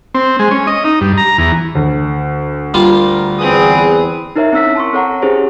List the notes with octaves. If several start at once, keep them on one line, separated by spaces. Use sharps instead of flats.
C4
G#3
C#4
D#5
D#4
G2
A#5
E2
D2
G3 F4 A#4
E2 C4 G#4 B4 D#6
D#4 E4 A#4 C#5 E5 A#5
C4 C#4 E6 B6
A5 C6 C#6
C4 A4 C#5 F#5 A#5
C#4 E4 G4 G#4 C5 C#5